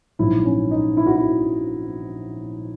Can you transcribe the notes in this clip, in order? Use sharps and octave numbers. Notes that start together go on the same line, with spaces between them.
A#1 G#2 F#3 E4
C#4
D#4
E4
F#4
E4